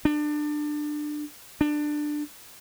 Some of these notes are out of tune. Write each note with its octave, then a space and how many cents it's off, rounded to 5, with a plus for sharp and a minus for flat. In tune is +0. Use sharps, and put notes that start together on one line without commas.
D4 +25
D4 +15